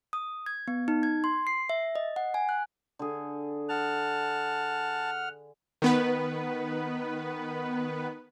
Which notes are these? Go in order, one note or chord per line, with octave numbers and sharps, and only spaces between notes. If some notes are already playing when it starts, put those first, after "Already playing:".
D#6
G#6
B3
D#4
G#6
C6
C7
E5
D#5
F#5
G#5
F#6
D3 G#4
F#5 A5 F6
D#3 B3 B4